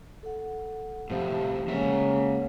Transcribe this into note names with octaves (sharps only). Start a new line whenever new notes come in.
A4 F#5
A2 C3 F3 G4 F5
C#3 G#3 A#3 C#5 E5 F#5